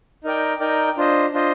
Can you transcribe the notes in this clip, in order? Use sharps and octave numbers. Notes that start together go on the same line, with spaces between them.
D#4 A#4 D5 G5
D#4 A#4 D5 G5
D4 F4 C5 D#5
D4 F4 C5 D#5